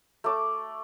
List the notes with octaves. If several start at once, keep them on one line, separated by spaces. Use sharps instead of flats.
A3 D6